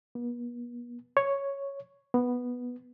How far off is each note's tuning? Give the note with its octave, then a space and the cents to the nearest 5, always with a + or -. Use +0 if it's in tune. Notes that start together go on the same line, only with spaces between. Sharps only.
B3 -45
C#5 +0
B3 -5